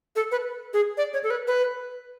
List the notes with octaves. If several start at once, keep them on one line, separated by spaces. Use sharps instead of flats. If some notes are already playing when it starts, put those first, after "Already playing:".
A4
B4
G#4
D5
C#5
A4
B4
B4